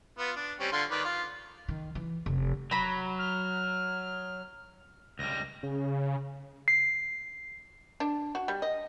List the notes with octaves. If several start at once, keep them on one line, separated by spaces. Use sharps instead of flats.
B3 F4
D4
G3 C4 C#4
D3 F4 C6
D#3 B4 D5
F4
D#3
E3
F1
F#3 A#5 B5
F6
C#2 G3 A#6
C#3
C7
D4
F#4
G3
D#5